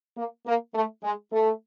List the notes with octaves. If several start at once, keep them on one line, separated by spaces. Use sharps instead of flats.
A#3
A#3
A3
G#3
A3